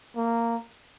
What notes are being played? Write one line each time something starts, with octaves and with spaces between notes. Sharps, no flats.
A#3